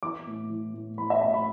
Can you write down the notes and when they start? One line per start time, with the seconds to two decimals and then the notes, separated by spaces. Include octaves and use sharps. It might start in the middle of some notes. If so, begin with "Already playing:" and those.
0.03 E3 D6
0.27 A2
0.50 E3
0.74 A2
0.97 E3 B5
1.10 E5
1.22 A2 E5
1.34 B5